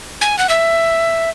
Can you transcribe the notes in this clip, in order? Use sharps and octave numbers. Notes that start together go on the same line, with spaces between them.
G#5
F#5
E5